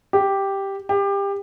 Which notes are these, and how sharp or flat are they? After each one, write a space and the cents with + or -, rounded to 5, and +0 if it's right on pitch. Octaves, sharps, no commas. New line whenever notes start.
G4 +0
G4 +25